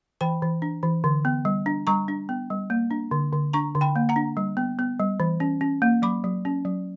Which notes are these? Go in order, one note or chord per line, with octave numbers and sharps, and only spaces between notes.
E3 G5 B5
E3
D4
E3
D3
B3
G3
D4
G3 A#5 C#6
D4
B3
G3
A#3
D4
D3
D3
D4 A#5 C#6
D3
G5 B5
A#3
F#5 A#5
D4
G3
B3
B3
G3
E3
C#4
C#4
A#3
F#3 B5 D6
F#3
C#4
F#3